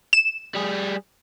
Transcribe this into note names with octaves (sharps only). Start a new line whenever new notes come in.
E7
G3 G#4